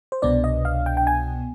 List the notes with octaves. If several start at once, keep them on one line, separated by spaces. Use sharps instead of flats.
C5
C2 B2 B3 D4 D5
D#5
F5
G5
G5
G#5